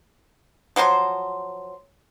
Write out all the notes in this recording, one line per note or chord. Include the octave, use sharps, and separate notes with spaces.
F3 F#3 C5 C6